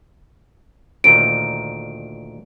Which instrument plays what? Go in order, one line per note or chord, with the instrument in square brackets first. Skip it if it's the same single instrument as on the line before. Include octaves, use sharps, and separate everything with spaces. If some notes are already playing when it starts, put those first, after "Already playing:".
[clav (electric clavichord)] D2 A#2 D#3 [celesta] D7